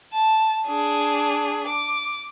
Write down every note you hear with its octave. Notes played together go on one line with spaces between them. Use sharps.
A5
D4 G#4
D6